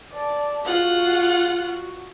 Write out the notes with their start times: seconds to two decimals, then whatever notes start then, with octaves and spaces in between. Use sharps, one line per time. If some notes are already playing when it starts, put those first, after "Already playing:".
0.12 D5 A5
0.65 G#3 F4 F#4 F#5
1.57 F#4